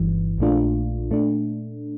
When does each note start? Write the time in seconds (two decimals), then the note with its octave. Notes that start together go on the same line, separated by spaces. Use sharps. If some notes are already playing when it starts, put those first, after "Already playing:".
Already playing: G1 G2 E3
0.38 A#1 A#2 A3 D4 F4
1.11 A#2 A3 D4